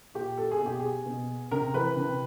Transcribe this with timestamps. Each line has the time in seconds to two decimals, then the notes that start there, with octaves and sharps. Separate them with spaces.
0.14 A#2 G4
0.38 A4
0.51 G#4
0.60 B2
0.66 G4
0.80 G#4
1.06 B2
1.51 C3 A#4
1.74 E3 B4
1.96 C3